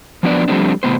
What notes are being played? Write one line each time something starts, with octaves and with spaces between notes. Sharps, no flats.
F3 F#3 B3 D4 B4 D5
F3 G3 A3 C4 D4
A2 C3 B3 C5